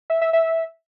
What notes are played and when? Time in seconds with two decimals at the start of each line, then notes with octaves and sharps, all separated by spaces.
0.10 E5
0.21 E5
0.33 E5